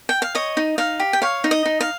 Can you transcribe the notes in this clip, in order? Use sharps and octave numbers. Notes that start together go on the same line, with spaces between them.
G5
F5
C#5 D#5
D#4
D#4 F5
G4
G5
C#5 F5
D#4
D#5
D#4
F5